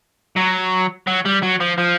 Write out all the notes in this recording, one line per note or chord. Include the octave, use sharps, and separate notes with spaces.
F#3
F#3
G3
F#3
F3
F3